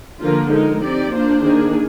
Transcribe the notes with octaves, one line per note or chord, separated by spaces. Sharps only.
D3 F3 A#3 F4 A#4
G#3 D#4 A#4
C4 D#4 G4 D5
A#3 D4 F4 C5
D#3 A#3 D4 G#4